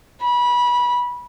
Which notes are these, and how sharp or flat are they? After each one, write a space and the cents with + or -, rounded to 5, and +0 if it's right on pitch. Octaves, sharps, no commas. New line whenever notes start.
B5 -25